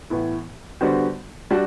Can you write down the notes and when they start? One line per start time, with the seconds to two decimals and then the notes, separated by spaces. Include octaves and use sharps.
0.10 A2 E3 B3 E4
0.81 D3 G3 B3 F#4 C5
1.51 G3 D4 F#4